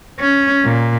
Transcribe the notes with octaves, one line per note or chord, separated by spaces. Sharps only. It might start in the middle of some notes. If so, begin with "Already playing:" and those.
C#4
A#2